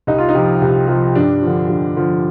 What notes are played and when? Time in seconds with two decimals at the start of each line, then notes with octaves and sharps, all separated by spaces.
0.07 C2 D#4
0.18 F4
0.29 D#4
0.35 C3 F3
0.61 C2
0.88 C3 F3
1.15 G2 D4
1.42 D3 F3
1.70 G2
1.96 D3 F3